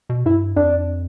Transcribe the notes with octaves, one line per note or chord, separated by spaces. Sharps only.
B2
G2 E4
F2 D4